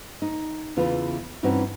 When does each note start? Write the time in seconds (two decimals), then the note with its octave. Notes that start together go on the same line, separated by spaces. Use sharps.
0.22 D#4
0.76 E2 C#3 E3 F4
1.43 G2 E3 C4 C#4 D#4 F#4